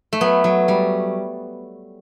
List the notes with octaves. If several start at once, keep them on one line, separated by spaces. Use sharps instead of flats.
A3
F#3 B3
F#3
G3